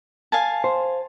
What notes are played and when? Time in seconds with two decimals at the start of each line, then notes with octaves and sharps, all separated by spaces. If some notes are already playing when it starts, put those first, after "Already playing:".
0.32 F5 G#5 A5
0.64 C5